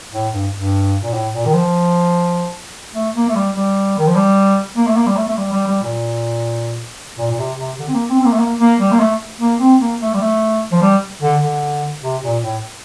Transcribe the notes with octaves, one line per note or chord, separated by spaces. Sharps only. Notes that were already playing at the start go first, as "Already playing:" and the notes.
A2
G2
G2
A#2
A2
A#2
D#3
F3
A3
A#3
A3
G3
G3
D#3
F3
G3
A#3
A3
A#3
G3
A3
A3
G3
G3
G3
A#2
A#2
A#2
C3
C3
D3
C4
A#3
C4
C4
A#3
A3
A#3
A#3
G3
A#3
A3
A#3
C4
A#3
A3
G3
A3
F3
G3
D3
D3
C3
A#2
A2